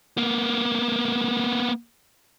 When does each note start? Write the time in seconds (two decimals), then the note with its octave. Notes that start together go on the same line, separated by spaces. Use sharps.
0.18 A#3 B3